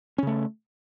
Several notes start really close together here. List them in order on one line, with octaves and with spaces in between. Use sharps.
C#4 C#3 A3